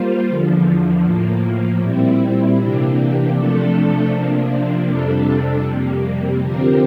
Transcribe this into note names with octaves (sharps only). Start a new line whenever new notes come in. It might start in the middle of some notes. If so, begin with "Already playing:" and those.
Already playing: G3 A#3 F4 C5
E2 D3 F3
A2 F3 A#3
A#2 G3 C4 E4
C3 E3 A#3 D4 G4
C3 F3 A3 D4 A4
C3 F3 A#3 D4
F2 C3 G3 D4 A4
F2 C3 G3 A#3
D3 F3 C4 G4 A#4